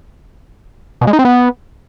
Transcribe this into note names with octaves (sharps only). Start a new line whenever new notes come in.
B2
G#3
D#4
C4
B3